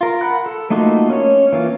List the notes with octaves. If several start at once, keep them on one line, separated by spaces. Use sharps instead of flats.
F4 A#4
F#5 B5 F#6
A4
A3 A#3 D#4 F4 F#4
C#4 C#5
E3 A#3 F4